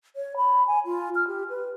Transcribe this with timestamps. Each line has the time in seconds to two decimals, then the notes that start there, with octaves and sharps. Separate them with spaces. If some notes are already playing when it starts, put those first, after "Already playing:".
0.16 C#5
0.37 B5
0.67 G#5
0.85 F4
1.15 F6
1.27 G4
1.50 B4